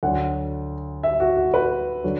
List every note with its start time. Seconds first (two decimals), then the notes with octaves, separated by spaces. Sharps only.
0.03 D2 D3 F#3 F#5
1.03 E5
1.20 F#4
1.36 F#4
1.54 B4
2.04 D3 F#3